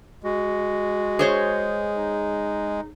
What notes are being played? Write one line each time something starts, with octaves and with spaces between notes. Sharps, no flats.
G#3 F#4
G#4 C5 C#5
D#4